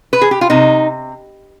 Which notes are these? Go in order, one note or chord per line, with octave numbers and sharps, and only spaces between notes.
B4
G#4
G4
F4
C3 D#4